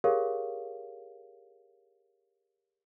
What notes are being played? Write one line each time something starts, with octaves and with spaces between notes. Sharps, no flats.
G4 G#4 A#4 C#5 F5